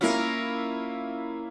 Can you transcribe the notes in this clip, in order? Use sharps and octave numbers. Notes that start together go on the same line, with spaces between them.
A#3 C#4 E4 F4 A#4